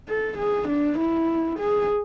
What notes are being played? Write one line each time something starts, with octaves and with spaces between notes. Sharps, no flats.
A4
G#4
D4
E4
G#4